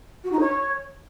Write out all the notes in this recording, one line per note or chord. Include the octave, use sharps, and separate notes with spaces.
F#4
D#4
C#5